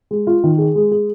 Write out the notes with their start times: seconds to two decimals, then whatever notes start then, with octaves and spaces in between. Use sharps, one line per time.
0.11 G#3
0.27 F4
0.44 D#3
0.58 G#4
0.75 G#3
0.91 G#4